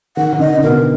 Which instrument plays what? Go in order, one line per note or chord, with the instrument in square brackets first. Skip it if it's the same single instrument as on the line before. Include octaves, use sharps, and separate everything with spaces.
[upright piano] D#3 [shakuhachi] F#5
[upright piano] D#3
[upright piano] D3 [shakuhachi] D#5
[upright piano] D3
[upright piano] B2 [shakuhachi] A#4